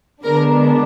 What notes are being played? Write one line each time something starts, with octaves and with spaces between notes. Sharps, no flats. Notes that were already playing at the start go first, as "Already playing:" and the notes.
D3 G#3 B3 D4 A#4